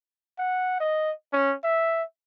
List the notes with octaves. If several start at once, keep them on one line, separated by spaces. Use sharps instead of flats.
F#5
D#5
C#4
E5